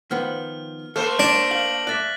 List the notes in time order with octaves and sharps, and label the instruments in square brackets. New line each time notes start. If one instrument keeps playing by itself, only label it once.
[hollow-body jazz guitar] D#3 F3 B3 [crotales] F6
[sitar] A3 A#3 C5 [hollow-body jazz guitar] A4 [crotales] F6
[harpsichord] D4 [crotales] A#6
[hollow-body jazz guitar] F5 [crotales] F#7
[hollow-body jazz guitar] D5 E5 [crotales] F#6 A6 B6